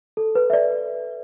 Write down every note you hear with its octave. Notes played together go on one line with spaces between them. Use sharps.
A4
B4
E5
D5